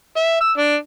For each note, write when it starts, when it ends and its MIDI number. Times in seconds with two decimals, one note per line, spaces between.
0.16 0.39 76
0.41 0.52 88
0.57 0.75 62